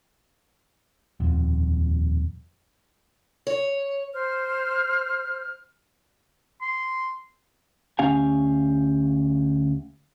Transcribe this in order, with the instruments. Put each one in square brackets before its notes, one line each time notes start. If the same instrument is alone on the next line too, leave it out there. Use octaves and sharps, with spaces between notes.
[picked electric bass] D#1 F2
[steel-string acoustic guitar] C#5
[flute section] C5 F6
[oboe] C6
[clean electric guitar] D2 C#4 G4 F5 G#5